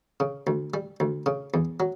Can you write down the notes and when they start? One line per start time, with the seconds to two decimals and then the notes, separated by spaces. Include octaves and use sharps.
0.20 C#3
0.47 D2
0.74 G3
1.00 D2
1.26 C#3
1.54 E2
1.80 F#3